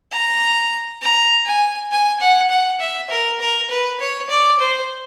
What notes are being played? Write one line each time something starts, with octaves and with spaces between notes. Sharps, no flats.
A#5
A#5
G#5
G#5
F#5
F#5
E5
A#4
A#4
B4
C#5
D5
C5